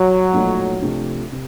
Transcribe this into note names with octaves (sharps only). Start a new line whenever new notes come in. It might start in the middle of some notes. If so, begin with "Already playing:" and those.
Already playing: F#3
B1 A#2 F3 A3
C3 F3 A3 D4
C3